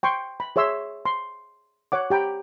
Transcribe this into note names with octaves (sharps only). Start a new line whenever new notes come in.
G5 C6 C#6
B5
G#4 C#5 E5 C6 E6
C6
C#5 F#5 D6
G4 G5 A#5 B5